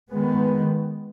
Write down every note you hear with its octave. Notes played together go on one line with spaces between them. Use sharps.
D#3 G#3 B3